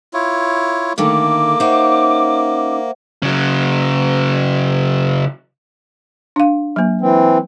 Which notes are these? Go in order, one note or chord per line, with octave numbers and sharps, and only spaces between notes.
E4 F4 C#5
D3 D#3 A3 A#3 D6
C#4 D#4 C5 E5 F#5
C#3 F#3
D4 F5
F#3 A#3
E3 C4